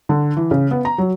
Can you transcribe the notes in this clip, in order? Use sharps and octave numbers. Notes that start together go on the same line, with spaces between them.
D3
E3
C#3
B3
A#5
F#3